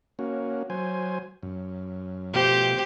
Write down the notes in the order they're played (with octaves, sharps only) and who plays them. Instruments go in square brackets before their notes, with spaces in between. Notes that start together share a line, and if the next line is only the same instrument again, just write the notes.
[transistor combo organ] A#3 C#4 F#4
F#3 C5 G#5
F#2
[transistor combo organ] B2 F3 A3 [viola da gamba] G4 C5